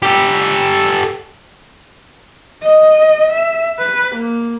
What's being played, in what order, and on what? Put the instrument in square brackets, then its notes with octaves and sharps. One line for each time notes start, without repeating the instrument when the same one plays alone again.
[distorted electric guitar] G4 A4
[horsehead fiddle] D#5
E5
B4
A#3